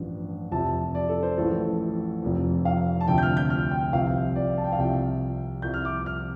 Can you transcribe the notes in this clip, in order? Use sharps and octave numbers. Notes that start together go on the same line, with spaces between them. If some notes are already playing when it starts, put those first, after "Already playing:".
Already playing: A1 G2 F3
F1 F2 C3 F3 A5
D5
A4
C5
A1 A2 F3 A4
F1 F2 F3
F5
A5
D2 C3 F3 G5
G6
F6
G6
F6
G5
C2 C3 F3 F5
D5
A5
G5
F5
C2 C3 F3 G5
C2 C3 F3 G6
F6
D6
F6